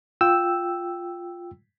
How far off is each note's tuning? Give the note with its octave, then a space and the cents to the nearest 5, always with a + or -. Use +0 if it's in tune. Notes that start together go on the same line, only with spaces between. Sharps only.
F4 +0 G5 +0 E6 +0